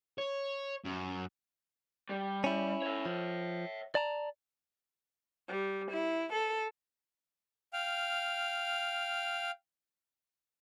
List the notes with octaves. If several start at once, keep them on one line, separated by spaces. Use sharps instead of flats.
C#5
F#2
G3
C#4 E4
C#5 E5
F3
D5 A5 A#5
G3
E4
A4
F5 G5 F6